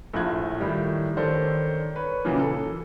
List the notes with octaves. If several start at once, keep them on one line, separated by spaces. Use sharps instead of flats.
A#1 A2 F4 F#6 G#6
A2 D#3 G3
D#3 D4 A4 C5 C#5
B4 C#5
A#2 C#3 E3 F#3 A#3
A4